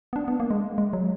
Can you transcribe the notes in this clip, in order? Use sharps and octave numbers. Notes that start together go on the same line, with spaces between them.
B3
D4
B3
A#3
G#3
G#3
F#3